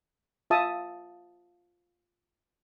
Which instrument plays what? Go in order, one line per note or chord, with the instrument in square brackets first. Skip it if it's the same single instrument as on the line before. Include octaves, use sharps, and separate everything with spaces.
[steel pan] F4 E5 A5 D#6